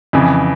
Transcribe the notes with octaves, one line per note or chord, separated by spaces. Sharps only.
F2 C#3 E3